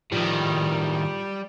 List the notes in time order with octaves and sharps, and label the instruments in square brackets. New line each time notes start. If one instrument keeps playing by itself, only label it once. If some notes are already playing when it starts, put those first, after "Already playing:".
[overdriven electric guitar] A2 D#3 [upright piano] F3 [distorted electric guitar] G3